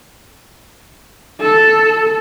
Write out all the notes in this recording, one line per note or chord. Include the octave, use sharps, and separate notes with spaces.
A4